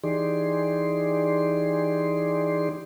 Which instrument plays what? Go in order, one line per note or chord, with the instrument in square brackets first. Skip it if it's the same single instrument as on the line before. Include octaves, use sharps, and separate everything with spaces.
[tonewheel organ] E3 D#4 G4 G#4 D5 C6